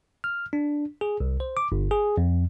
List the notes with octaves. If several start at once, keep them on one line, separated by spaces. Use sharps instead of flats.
F6
D4
G#4
C2
C5
D6
G1
G#4
F2